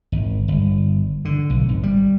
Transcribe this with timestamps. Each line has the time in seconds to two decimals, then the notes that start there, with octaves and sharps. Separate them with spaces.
0.12 G#1
0.48 G1
1.25 D3
1.50 B1
1.69 G#1
1.83 G3